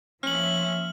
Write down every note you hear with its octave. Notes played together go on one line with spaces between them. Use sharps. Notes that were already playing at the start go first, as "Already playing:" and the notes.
F3 A#3 C#4 E5 F6 F#7